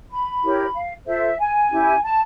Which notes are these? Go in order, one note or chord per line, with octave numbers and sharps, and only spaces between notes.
B5
E4 G4 A#4 C#5
F5
F4 A4 C5 E5
G#5
C#4 E4 G4
A5